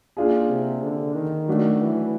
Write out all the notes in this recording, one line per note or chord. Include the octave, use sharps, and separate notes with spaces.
A#3 D4 F4 G#4
C3
D3
D#3
F#3 A3 D4 F#4
E3